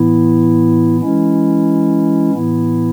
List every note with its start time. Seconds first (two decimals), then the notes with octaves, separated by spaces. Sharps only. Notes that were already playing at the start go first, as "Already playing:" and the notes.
Already playing: A2 E3 B3 E4
1.00 E3 G#3 C#4 E4
2.34 A2 E3 B3 E4